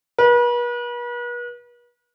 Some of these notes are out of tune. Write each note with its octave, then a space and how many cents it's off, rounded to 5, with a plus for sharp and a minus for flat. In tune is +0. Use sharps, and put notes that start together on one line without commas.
B4 -40